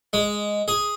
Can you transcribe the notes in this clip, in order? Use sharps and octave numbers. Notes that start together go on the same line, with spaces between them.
G#3
G#4